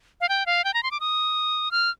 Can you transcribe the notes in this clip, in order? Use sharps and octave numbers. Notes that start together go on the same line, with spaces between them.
F5
G5
F5
G5
A#5
C6
D6
D#6
F6